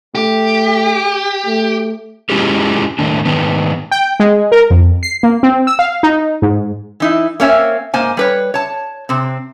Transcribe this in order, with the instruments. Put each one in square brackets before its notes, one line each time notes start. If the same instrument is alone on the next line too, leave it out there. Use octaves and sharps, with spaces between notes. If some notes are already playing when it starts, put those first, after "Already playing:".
[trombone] A3 [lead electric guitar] G4
[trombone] A3
[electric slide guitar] G#3 C#4 E4 F4 G4 G#4
A2 D#3 D4
G#2 D#3 B3
[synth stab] G5
G#3
A#4
F2
C7
A#3
C4
E6
F5
D#4
G#2
[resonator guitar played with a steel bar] E3 D#4 E4
A#3 C4 C#4 C#5 E5 G#5
G#2 A#3 C5 G#5
G3 B4 C#5
C#5 A5
C3 C4